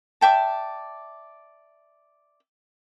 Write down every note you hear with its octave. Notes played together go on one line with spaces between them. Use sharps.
D5 E5 G5 A5